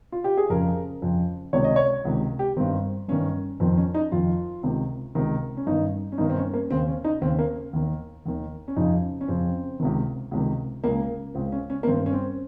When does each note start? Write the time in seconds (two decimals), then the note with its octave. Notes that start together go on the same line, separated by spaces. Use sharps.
0.12 F4
0.24 G4
0.37 G#4
0.50 F2 C#3 A#4
1.01 F2 C#3
1.53 C#2 C3 D#3 C#5
1.64 D#5
1.76 C#5
2.05 C#2 C3 D#3
2.39 G4
2.57 G2 D#3 C4
3.08 G2 D#3 C#4
3.60 F2 D#3 C4
3.77 C#4
3.94 D#4
4.12 F2 D#3 F4
4.63 C#2 C3 D#3
5.15 C#2 C3 D#3
5.57 C#4
5.67 G2 D#3 D#4
6.12 C#4
6.18 G2 D#3 D#4
6.30 C4
6.36 C#4
6.54 A#3
6.70 D#2 C#3 C4
6.88 C#4
7.04 D#4
7.21 D#2 C#3 C4
7.39 A#3
7.73 D#2 D#3
8.25 D#2 D#3
8.68 C#4
8.76 F2 C#3 D#4
9.21 C#4
9.28 F2 C#3 C4
9.80 C#2 C3 D#3
10.31 C#2 C3 D#3
10.83 C#2 C#3 A#3
11.35 C#2 C#3 C4
11.52 C#4
11.70 C#4
11.83 A#3
11.87 G2 D#3 C4
12.06 C#4
12.13 C4